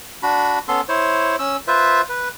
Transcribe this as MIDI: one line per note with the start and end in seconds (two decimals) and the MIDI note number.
0.23 0.59 62
0.23 0.59 66
0.23 0.59 83
0.68 0.81 59
0.68 0.81 61
0.68 0.81 69
0.68 0.81 84
0.89 1.36 64
0.89 1.36 72
0.89 1.36 73
1.39 1.57 61
1.39 1.57 88
1.68 2.02 65
1.68 2.02 71
1.68 2.02 72
1.68 2.02 76
2.09 2.29 71